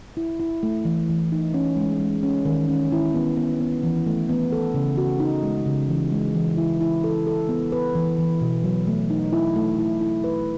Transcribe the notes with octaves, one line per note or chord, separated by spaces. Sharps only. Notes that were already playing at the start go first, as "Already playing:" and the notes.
E4
E4
A3
E3
E3
D#4
C#4
G#3
G#3
C#4
D#3
C#4
E4
B3
B3
B3
E3
A3
B3
A4
C#3
F#4
D#4
G#3
C#3
E3
G#3
E3
E4
E4
A4
A4
B3
B4
E3
E3
B2
F#3
A3
D#4
E4
A3
E4
E4
B4